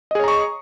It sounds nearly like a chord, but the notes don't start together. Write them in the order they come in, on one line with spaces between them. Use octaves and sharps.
D#5 G#4 C#5 A#5 C#6